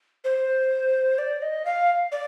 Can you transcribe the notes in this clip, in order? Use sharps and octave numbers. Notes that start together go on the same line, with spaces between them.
C5
D5
D#5
F5
D5